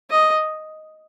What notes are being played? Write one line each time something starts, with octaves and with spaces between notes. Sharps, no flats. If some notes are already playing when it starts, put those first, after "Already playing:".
D#5